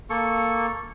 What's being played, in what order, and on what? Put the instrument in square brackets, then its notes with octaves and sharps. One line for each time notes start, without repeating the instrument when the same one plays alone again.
[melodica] A#3 A4 C#6